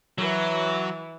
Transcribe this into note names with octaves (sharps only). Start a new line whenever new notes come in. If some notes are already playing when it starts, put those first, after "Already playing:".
E3 F#3